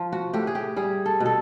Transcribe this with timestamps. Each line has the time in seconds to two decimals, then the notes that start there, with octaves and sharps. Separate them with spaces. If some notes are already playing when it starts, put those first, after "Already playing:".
Already playing: F3
0.13 F#4
0.33 A2 G4
0.47 G#4
0.55 G4
0.77 G3 G#4
1.06 A4
1.20 B2
1.26 A4